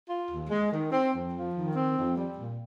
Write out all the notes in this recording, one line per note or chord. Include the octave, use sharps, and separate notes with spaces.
F4
D#2
G#3
D#3
C4
F2
F3
D#3
C4
F2
G3
A#2